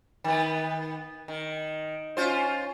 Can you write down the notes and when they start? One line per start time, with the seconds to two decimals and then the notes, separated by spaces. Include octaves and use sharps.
0.24 D#3 B3
1.28 D#3
2.17 C#4 F4 C5